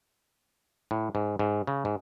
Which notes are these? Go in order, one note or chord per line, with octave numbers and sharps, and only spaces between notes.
A2
G#2
G#2
C#3
G#2